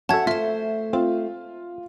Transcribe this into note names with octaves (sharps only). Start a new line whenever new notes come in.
C#4 F#4 A4 E5 F#5 A5 G#6
A3 F4 C5 E5
C4 F4